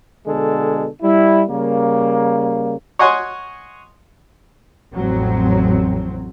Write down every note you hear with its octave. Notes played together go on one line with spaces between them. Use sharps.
B2 D3 G#3 A4
G3 E4
C#3 G3 A#3
C#5 D#5 F#5 G#5 C6 C#6
A1 F2 A2 F#3 C4